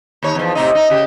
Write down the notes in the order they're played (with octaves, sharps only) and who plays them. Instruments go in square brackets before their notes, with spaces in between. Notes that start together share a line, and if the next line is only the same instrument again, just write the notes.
[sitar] D#2 D#4 C#5
E2 F3
A2 C3 D#4
D#4
C#3 G4